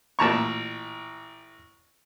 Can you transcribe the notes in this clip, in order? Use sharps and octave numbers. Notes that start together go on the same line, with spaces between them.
A1 A#2 A5 A#5 C#6